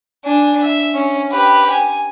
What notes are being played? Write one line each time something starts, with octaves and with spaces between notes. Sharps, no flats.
D4 G#5
E5
C#4
G4 B4
G#5